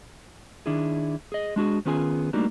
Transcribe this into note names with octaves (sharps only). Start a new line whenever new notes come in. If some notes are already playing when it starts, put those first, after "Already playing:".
D#3 D4 E4 G#4
G#4 D#5
G#3 D4 F#4 G#4
D#3 B3 C#4 F4 G#4 G#5
G3 A3 A#3 D4 D#4 F#4